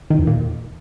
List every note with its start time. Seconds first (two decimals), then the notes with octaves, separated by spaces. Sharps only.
0.10 D#3
0.19 E2
0.27 A#2